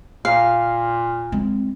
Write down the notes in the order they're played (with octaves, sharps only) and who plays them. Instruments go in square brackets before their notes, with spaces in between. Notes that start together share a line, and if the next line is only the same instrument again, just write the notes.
[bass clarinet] A#2 [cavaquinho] F5
[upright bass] G#3 C4